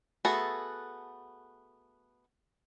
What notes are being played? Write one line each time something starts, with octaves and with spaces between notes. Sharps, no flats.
A3 B3 F#4 G#4 A4